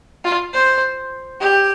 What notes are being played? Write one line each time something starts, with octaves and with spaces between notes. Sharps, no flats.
F4
C5
G4